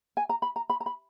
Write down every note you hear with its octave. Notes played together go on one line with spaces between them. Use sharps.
G#5
A#5
B5
A#5
B5
A#5
B5